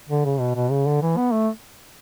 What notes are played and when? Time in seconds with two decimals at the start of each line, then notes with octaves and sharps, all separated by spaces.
0.09 D3
0.25 C#3
0.40 B2
0.55 B2
0.71 C#3
0.87 D3
1.02 E3
1.17 B3
1.33 A3